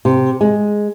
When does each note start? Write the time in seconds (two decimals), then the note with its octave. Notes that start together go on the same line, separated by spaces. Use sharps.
0.05 C3
0.41 G#3